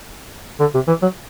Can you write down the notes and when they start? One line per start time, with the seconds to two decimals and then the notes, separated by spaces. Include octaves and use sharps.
0.60 D3
0.74 C3
0.87 E3
1.02 F#3